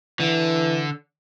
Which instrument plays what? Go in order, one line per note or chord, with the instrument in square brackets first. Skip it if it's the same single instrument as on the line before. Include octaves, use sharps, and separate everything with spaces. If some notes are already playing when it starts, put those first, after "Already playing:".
[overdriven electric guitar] D3 [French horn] E3